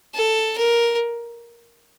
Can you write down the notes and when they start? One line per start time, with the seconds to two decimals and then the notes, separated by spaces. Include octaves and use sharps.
0.15 A4
0.58 A#4